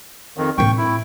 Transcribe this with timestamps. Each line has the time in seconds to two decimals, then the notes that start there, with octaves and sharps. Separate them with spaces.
0.37 F2 D#3
0.58 A2 C4 G5 C#6
0.77 E4